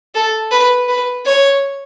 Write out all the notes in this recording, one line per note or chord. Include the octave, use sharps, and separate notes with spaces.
A4
B4
B4
C#5